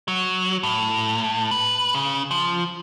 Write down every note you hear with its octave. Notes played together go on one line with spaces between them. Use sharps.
F#3
A2
B4
C#3
F3